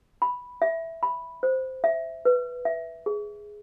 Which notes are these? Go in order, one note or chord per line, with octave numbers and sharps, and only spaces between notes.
B5
E5
B5
C5
E5
B4
E5
G#4